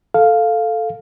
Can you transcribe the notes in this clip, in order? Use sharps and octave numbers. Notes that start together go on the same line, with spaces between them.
A4 F5